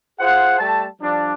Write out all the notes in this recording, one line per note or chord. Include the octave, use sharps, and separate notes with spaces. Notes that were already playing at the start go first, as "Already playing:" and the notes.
F4 G#4 C5 F#5
G3 A3 A5
F3 G3 D4